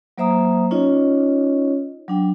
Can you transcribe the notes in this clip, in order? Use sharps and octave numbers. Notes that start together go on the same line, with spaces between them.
F#3 A#3 C5 E5 A#5 D#6
C#4 D#4 F4 C#5 D#5
F#3 D4 G5